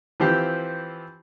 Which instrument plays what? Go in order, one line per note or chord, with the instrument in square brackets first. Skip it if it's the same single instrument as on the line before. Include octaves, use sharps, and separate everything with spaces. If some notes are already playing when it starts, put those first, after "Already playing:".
[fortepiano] E3 F3 C4 G4 C5